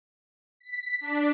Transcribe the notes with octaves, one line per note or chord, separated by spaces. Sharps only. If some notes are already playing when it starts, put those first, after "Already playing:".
B6
D4